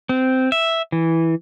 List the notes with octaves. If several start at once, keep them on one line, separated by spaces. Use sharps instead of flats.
C4
E5
E3